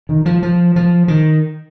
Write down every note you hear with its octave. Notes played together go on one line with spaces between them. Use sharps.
D#3
F3
F3
F3
D#3